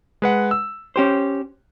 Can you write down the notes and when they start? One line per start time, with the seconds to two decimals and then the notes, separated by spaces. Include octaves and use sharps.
0.22 G#3 B4 F#5
0.51 E6
0.96 C#4 G4 C5